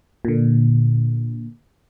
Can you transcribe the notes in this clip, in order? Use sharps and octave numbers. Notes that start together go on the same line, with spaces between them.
A#2 D3